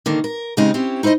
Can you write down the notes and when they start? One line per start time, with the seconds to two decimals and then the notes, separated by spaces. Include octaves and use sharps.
0.06 D3 D#3 A#3
0.24 A#4
0.57 C#3 G#3 C4 C#4 D#4 G4
0.74 C4 C#4 E4 G4
1.03 D#4 E4 C5 D5 D#5